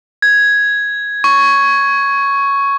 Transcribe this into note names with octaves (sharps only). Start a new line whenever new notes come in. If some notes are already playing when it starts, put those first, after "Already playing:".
G#6
C#6